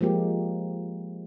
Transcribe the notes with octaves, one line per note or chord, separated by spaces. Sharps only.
F3 G#3 A#3 G4